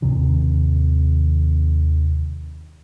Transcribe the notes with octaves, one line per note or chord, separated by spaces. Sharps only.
D#2 G#2 C3 D#3